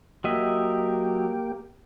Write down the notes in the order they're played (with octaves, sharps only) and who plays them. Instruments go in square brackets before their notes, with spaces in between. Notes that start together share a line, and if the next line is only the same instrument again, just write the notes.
[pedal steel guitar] F#3 D#5 E5 [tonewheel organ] A#3 G4